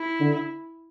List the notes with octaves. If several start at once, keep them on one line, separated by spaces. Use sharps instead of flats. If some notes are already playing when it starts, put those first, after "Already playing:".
Already playing: E4
D3